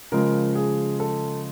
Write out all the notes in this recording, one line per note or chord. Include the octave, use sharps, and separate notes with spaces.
C#3 F3 G#3 A#4
G#4
A4